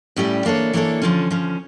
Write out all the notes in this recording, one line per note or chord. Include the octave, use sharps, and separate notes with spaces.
A2 G3 C#4 G4 D5
E3 A#3 D4 A4 C#5
E3 A#3 D4 A4 C#5
D3 F3 C#4
D3 F3 C#4